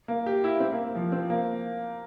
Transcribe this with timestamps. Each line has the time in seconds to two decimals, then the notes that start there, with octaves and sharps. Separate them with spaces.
0.08 A#3
0.26 G4
0.44 E4
0.60 C4
0.72 A#3
0.95 F3
1.12 C4
1.30 A#3